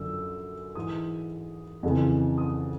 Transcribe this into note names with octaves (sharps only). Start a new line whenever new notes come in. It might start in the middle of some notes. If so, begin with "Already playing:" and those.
Already playing: F#2 D3 F3 E6
G#2 E3 D#6
F2 C#3 E3
D#6